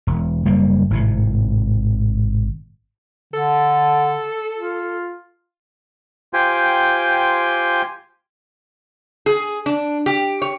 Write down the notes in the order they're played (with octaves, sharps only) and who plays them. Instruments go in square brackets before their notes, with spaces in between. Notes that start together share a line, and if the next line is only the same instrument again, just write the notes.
[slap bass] E1
F#1 G3 A#3
G#1 A2 C3
[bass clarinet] D3 [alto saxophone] A4
[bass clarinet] F4
[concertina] F4 G4 C5 G5 G#5
[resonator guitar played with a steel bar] G#4
D4
G4
C#5